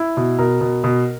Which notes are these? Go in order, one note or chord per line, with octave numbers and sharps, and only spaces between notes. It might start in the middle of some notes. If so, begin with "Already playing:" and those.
Already playing: E4
B2
B2 A#4
B2
B2